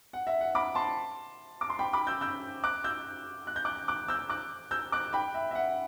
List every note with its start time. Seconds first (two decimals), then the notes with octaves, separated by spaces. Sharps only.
0.13 F#5
0.27 E5
0.41 F#5
0.55 B5 D6
0.75 A5 C6
1.61 D6
1.70 C6
1.79 G5 B5
1.93 B5 D6
2.07 E6 G6
2.21 E6 G6
2.64 D6 F#6
2.84 E6 G6
3.47 F#6
3.56 G6
3.65 D6 F#6
3.88 D6 F#6
4.08 E6 G6
4.29 D6 F#6
4.71 E6 G6
4.92 D6 F#6
5.13 G5 B5
5.34 E5
5.51 E5
5.55 F#5